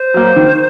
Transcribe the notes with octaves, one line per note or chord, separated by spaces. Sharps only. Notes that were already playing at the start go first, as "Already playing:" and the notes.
Already playing: C5
F#3 A#3
D#3